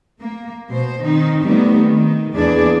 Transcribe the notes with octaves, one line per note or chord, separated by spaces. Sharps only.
A#3
B2 C5
D#3 C4 D#4
D#3 G3 A3 B3 C4
D#3
E2 E3 A#3 D4 G#4 D5